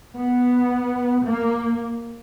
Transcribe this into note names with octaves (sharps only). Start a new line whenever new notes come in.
B3
A#3